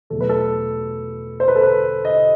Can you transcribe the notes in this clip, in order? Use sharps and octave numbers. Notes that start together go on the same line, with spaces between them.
E2 B2 F#3 A3 A4
B4
A4
C5
B4
A4
B4
D#5